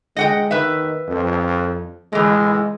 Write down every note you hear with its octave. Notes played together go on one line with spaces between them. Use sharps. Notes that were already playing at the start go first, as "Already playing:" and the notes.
G#3 D#5 F#5 G5
D#3 B4 E5
F2
A2 E3 G#3